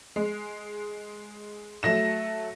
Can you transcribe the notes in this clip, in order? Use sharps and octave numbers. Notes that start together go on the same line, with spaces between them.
G#3
F#3 A3 A#6 E7